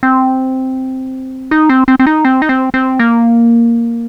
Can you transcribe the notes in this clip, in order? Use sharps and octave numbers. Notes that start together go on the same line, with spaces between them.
C4
D#4
C4
C4
C4
D#4
C4
D#4
C4
C4
A#3